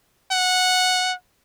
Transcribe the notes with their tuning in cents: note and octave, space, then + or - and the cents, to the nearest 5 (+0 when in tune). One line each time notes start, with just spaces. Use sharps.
F#5 -10